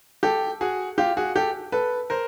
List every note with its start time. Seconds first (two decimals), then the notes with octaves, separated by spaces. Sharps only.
0.23 G4 A4
0.61 F#4 G#4
0.98 F4 G4
1.17 F#4 G#4
1.35 G4 A4
1.72 A4 B4
2.10 A#4 C5